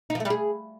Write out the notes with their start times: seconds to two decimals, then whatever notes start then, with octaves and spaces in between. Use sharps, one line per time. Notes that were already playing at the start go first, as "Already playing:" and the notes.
0.10 D#4
0.15 F3
0.20 A3
0.25 G3
0.30 G#4